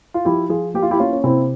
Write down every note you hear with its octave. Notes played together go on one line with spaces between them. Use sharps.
F4
F3 E4 G4
F3 F4 G#4
A#3 G4
F4
E4 G4
A#3 C#4 F4
C#4
C3 C4 E4